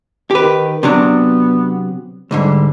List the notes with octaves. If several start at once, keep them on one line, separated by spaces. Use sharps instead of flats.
D#3 G4 B4
C3 F#3 B3 D4
D2 G#2 D3 G3